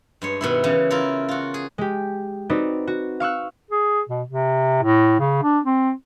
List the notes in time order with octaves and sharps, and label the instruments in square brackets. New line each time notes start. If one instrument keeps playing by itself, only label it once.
[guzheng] G2 G#3 C#5
B2 D#3 E4
C#3 E3
E4 F4 A#4
F4 F#4
G#4
[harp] G#3 G4
C4 D#4 F#4 B4 D5
F#4
F5 C#6 E6 F#6
[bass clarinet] G#4
B2
C3
A2
C#3
D4
C4